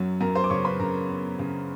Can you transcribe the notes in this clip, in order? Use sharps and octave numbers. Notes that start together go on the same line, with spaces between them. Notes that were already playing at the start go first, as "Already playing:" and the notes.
Already playing: F#2 F#3
F#2 A#4 A#5
C5 C6
D6
C#3 C#5 C#6
B4 B5
C#3 A#4 A#5
B3
C#3